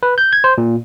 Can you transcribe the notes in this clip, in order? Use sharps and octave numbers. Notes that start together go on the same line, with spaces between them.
B4
G6
G#6
C5
A#2